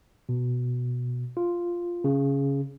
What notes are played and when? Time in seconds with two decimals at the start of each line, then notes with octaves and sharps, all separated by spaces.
0.29 B2
1.37 F4
2.04 C#3